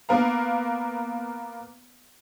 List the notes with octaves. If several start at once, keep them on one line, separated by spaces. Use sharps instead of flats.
A#3 B3 A#4 B4 F5 A#5